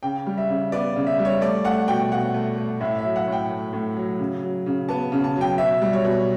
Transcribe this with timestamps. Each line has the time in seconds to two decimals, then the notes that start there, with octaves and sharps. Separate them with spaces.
0.03 C#3 G5
0.26 G3
0.38 E5
0.49 C#3
0.72 B3 D5
0.96 C#3
1.07 E5
1.19 G3
1.25 C#5
1.41 A3 D5
1.64 A3 F#5
1.88 B2 G5
2.12 B2 F#5
2.34 A3
2.57 A3
2.81 A2 E5
2.98 E5
3.04 F#3
3.16 F#5
3.27 A2 G5
3.50 A3
3.73 A2
3.97 F#3
4.19 C#3
4.43 F#3
4.66 C#3
4.89 B3 A5
5.12 C#3
5.24 A5
5.36 F#3
5.41 G5
5.58 B2 E5
5.82 G3
5.93 C#5
6.05 B2